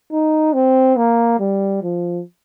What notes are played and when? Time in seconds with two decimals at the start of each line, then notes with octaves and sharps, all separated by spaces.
0.12 D#4
0.53 C4
0.97 A#3
1.40 G3
1.83 F3